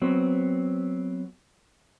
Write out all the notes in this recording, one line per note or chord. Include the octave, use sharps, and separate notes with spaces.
F#3 B3 C4